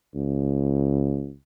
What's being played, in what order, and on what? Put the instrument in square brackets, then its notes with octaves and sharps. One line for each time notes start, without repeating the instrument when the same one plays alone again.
[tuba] C#2